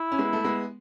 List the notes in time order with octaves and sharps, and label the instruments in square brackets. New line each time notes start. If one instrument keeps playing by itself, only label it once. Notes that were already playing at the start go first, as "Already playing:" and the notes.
Already playing: [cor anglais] E4
[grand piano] C#4
G#3 B3
A3
G#3 B3